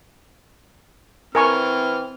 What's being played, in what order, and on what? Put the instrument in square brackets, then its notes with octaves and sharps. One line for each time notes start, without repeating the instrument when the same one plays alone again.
[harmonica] E3 F6 [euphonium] C4 [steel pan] A#4 G#5 C#6